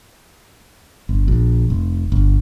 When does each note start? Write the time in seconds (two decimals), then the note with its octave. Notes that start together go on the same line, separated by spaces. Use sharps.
1.09 G1
1.28 A#1
1.70 F1
2.12 G1